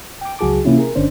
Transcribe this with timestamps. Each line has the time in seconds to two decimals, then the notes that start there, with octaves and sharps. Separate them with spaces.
0.21 G5 D6
0.39 C#2 F#3 F#4 G#4 A5 D6
0.65 C3 E3 A#3 C#4 E4 F4
0.78 G#4 A#4
0.95 G1 D3 C#4 D4 C5